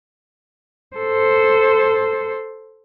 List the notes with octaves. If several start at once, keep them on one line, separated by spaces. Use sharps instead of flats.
A4 C5